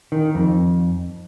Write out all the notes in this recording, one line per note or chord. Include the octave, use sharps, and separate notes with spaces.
D#3
F2